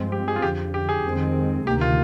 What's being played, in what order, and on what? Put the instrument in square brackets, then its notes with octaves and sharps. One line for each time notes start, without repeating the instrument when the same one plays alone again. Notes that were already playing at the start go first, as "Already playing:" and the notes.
Already playing: [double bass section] G2 F3 G#3 C4
[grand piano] G4
G#4
F4
[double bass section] F2 D3 F3 [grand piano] G4
[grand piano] G4
G#4
[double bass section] F2 D#3 G#3 C4
[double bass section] D2 C3 D#3 A#3 [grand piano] G4
[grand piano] F4